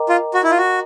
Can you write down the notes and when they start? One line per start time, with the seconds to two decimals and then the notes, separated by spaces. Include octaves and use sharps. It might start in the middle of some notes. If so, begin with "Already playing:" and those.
Already playing: A#4 D#5 G5 A#5 D6
0.09 F4
0.34 F#4
0.43 E4
0.50 F4
0.58 F#4